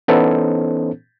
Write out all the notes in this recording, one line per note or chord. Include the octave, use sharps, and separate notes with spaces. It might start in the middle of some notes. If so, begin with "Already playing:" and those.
E3 B3 C#4 D#4 A4 C5